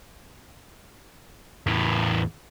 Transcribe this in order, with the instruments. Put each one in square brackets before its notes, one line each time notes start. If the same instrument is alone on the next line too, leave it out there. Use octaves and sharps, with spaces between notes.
[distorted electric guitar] E2 A2